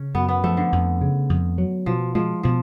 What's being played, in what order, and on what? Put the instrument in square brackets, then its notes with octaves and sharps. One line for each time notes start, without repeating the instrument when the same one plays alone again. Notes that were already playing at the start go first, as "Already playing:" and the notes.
Already playing: [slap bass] C#3 [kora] C#4
[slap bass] F#2 [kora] B3
[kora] B3
[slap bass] F3 [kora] A3
[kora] D3
[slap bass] F2
C#3
F2
F#3
[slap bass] B2 [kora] F3
[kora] F3 [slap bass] G#3
[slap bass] B2 [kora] F3